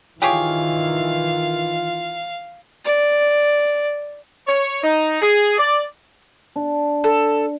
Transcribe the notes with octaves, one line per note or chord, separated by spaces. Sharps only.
D#3 E3 F4 G4 G#4 C#5 F5
D5
C#5
D#4
G#4
D5
D4
A4